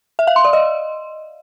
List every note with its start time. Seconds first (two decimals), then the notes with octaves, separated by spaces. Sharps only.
0.19 E5
0.27 F5
0.36 C6
0.45 D5
0.53 D#5